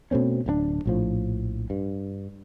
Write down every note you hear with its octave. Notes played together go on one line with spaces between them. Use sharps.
B2 A3 C4 C#4
D1 G2 D4
A#1 A2 F3
G2